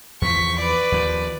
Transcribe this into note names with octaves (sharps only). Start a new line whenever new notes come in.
E2 F3 C#6 B6
B4 D5
D#2 F3